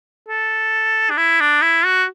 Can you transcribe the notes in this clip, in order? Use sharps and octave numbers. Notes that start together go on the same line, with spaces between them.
A4
D4
E4
D4
E4
F#4